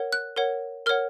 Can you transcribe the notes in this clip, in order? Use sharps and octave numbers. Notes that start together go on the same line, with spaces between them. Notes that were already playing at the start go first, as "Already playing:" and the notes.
Already playing: A#4 C#5 F#5
F#6
A#4 C#5 F#5
A#4 C#5 F#5 F6